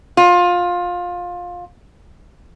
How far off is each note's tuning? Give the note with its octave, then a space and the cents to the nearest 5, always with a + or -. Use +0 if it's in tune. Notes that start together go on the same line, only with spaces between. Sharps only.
F4 +20